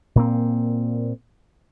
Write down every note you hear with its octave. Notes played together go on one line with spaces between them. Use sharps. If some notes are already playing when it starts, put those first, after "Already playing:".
A#2 A#3 C4